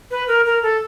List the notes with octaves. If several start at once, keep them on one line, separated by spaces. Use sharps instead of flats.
B4
A#4
A#4
A4